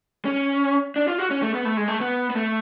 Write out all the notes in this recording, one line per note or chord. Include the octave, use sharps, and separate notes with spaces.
C#4
D4
F4
F#4
C#4
A3
B3
A3
G#3
A3
B3
B3
A3